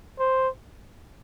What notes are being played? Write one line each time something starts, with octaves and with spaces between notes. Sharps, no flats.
C5